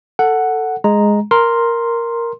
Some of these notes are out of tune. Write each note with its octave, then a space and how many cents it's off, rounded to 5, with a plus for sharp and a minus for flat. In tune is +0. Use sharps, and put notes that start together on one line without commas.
A4 +15 F#5 +0
G#3 +0 A#5 +0
A#4 +0 C6 +5